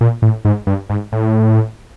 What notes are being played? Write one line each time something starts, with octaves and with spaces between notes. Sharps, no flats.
A#2
A2
G#2
G2
G#2
A2